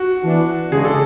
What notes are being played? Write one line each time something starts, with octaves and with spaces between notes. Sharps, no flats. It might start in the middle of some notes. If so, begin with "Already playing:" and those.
Already playing: F#4
E3 B3 D4
C#3 G#3 D4 G#4
A4